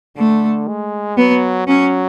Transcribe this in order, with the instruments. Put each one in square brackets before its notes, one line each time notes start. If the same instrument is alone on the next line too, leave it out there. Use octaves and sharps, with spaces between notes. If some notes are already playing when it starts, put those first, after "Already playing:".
[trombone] D3 [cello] A3
[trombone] G#3
[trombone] F#3 [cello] B3
[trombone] F#3 [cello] C#4